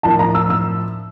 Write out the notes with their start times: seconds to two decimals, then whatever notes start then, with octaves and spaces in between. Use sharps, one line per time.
0.03 A2 F3 A#3 D4 A5
0.19 A#5
0.35 E6
0.50 E6